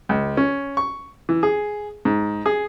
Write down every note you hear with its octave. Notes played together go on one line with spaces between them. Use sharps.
C#2
C#4
C#6
E3
G#4
G#2
G#4